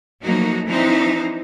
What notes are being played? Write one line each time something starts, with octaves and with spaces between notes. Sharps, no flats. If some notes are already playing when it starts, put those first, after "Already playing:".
F3 F#3 A3 A#3 D#4 F#4
E3 F3 C4 D4 D#4 C5